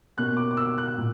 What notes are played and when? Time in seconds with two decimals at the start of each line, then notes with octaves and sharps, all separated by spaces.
0.17 B2 A#3 C#4 F#6
0.37 D6
0.51 D6
0.57 E6
0.78 F#6
0.98 A#2